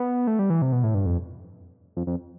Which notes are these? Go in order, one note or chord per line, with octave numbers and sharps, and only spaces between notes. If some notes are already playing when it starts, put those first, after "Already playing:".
Already playing: B3
A3
G3
E3
C3
B2
A2
G2
F2
F2
F2